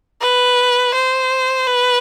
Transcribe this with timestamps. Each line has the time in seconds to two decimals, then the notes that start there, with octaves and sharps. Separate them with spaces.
0.21 B4
0.94 C5
1.67 B4